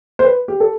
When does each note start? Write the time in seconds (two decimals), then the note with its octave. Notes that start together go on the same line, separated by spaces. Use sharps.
0.19 C5
0.25 B4
0.48 G4
0.60 A4